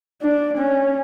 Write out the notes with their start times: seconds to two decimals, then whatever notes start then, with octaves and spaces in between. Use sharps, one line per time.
0.22 D4
0.57 C#4